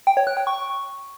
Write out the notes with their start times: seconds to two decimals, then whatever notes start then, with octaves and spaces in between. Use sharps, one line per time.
0.07 G5
0.17 C#5
0.27 F#6
0.37 G5
0.47 C#6